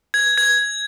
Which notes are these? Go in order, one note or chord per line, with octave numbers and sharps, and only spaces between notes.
G#6
G#6